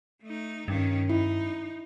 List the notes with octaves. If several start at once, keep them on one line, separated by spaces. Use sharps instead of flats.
A3 D#4
G2 D#3 C#4
D#4 E4